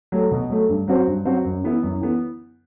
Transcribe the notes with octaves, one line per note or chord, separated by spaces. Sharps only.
F#3 A3
B2
F#3 A3
G2
F#3 C4 F#4 C5
G2
F#3 C4 F#4 C5
F#2
E3 B3 E4
F#2
E3 B3